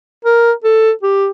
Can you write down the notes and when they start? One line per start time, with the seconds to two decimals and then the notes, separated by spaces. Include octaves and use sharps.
0.25 A#4
0.64 A4
1.03 G4